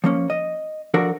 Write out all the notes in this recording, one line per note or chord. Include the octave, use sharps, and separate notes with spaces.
F3 A#3 C#4
D#5
F3 D4 F#4 A4 A#4